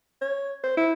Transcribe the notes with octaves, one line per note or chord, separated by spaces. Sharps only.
C#5
C5
E4